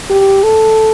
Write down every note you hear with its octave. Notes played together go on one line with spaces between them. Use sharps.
G4
A4